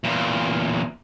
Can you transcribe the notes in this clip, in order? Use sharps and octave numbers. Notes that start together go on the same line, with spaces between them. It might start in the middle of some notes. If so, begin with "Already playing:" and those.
E2 A#2